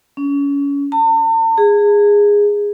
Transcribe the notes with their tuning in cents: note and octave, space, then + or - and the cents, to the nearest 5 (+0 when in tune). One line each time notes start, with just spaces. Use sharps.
C#4 +30
A5 +45
G#4 -15